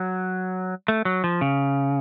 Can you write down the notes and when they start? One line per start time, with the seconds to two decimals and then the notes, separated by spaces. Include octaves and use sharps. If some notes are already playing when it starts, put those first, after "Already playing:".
Already playing: F#3
0.88 A3
1.05 F#3
1.24 F3
1.41 C#3